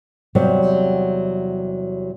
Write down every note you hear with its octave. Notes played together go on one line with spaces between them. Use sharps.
E2 C3 F#3 G3 C4 C#5